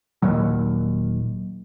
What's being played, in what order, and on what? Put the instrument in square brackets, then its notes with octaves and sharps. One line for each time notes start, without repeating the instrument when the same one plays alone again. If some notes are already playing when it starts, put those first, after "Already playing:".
[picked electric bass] D#1 D#2 A#2 F#3